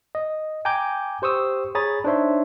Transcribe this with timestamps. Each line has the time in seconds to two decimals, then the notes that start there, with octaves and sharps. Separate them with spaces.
0.15 D#5
0.65 G5 G#5 A#5 D6 G6
1.22 G4 C5 C#6 D#6 E6
1.75 G#4 C#5 A#5 B5 D#6 A6
2.04 D4 D#4 C5 C#5 E5 C6